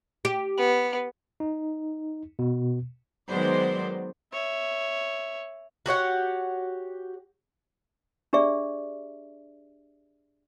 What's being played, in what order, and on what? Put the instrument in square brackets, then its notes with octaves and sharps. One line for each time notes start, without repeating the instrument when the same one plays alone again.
[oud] G4
[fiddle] B3
[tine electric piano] D#4
B2
[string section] D#3 F#3 G#3 B3 C5 D5
[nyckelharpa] C#5 E5
[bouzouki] F#4 G4 C#5 F#5
[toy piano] D4 G4 G#4 D5 E5